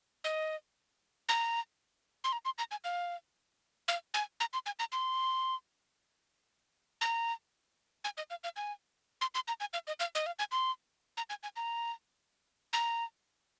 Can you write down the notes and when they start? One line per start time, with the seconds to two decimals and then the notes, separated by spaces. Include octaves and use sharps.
0.24 D#5
1.29 A#5
2.24 C6
2.33 A#5
2.45 C6
2.58 A#5
2.71 G#5
2.84 F5
3.88 F5
4.14 G#5
4.40 A#5
4.53 C6
4.66 G#5
4.79 A#5
4.92 C6
7.01 A#5
8.04 G#5
8.17 D#5
8.30 F5
8.44 F5
8.56 G#5
9.21 C6
9.35 C6
9.48 A#5
9.60 G#5
9.73 F5
9.87 D#5
10.00 F5
10.15 D#5
10.26 F5
10.39 G#5
10.52 C6
11.17 A#5
11.30 G#5
11.43 G#5
11.56 A#5
12.73 A#5